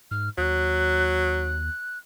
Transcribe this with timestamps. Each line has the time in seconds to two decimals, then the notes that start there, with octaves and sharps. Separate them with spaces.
0.11 G#2 F6
0.38 D#2 F#3 F#6